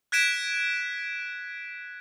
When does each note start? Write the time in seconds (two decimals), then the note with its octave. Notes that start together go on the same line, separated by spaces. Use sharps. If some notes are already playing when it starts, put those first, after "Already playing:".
0.12 F#6 G#6 B6 D7 E7